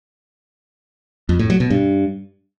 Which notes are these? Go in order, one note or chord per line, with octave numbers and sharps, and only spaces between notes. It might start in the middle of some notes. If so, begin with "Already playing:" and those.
F2
A2
F#3
B2
G2